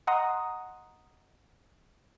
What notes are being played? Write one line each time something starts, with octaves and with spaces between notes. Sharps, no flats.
D#5 F#5 A#5 C6 D#6